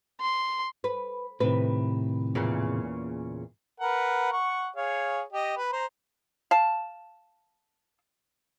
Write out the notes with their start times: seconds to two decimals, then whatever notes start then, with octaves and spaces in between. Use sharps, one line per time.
0.20 C6
0.84 B4
1.40 A2 C3 D#3 B4
2.35 E2 A#2 C#3
3.80 A#4 B4 F#5
4.32 F#5 C#6
4.76 G#4 C#5 F5
5.33 G4 D#5
5.57 B4
5.73 C5 A#5
6.51 F5 A5